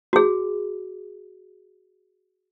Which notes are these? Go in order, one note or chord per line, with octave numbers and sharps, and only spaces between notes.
F#4 G#4